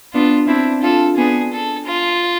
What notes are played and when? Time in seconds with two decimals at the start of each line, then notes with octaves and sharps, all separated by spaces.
0.13 B3 D4 F4
0.48 C4 D4 E4
0.82 D4 F4 A4
1.17 B3 D4 G#4
1.52 A4
1.86 F4